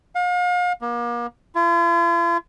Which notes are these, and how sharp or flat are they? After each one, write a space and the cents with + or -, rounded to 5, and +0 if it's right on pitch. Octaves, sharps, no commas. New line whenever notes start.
F5 +40
A#3 +35
F4 -45